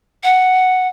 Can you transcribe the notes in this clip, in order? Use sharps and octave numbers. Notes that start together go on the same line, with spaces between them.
F#5